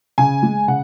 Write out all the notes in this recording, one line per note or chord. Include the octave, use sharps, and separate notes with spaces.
C#3 G#5
G#3
C#3 F#5